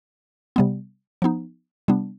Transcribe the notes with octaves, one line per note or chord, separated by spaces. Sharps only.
C3 G3 B3
F3 B3 D#4
C3 G3 B3 D4